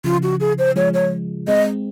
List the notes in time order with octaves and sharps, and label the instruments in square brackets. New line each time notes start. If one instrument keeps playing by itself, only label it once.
[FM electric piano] C#3 F3 [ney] F4
[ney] F#4
G#4
C5
[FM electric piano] F3 G#3 [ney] C#5
[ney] C#5
[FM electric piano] G#3 C4 [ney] D#5